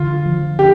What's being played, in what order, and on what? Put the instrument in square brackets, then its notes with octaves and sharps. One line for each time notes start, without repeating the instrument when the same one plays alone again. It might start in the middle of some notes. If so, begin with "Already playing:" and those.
Already playing: [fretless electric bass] D3 [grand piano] F4
[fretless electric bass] F3
[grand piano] G4